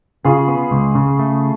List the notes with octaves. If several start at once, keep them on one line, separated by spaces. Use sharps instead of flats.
C#3 F4 G#4
B3
C#2
C#3
A3